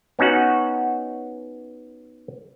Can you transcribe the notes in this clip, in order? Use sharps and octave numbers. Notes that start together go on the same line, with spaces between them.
B3 C#4 D#4 F#4 F#5